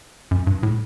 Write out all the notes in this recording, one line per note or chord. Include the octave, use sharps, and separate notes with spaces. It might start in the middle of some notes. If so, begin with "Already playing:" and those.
F#2
G2
A2